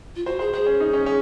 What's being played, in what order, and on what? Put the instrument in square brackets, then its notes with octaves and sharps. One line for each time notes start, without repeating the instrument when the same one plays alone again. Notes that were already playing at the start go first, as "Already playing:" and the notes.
[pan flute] F4
[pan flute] F#4 [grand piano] C5
[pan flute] G#4 [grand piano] C5
[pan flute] G#4 [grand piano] C5
[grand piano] C#4
D#4
C#4
C#4